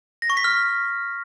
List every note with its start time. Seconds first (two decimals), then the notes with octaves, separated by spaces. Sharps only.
0.22 A#6
0.30 C#6
0.37 B6
0.44 F6